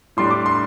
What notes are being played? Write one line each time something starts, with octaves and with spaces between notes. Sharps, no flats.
A2 G3 D4 C6
D6
C6